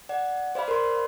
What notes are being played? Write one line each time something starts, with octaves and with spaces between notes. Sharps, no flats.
D5 F#5
C5 D5 F5 B5
A#4 C5 D5 C6